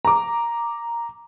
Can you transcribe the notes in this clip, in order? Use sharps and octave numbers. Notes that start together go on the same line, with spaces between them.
A#5 D6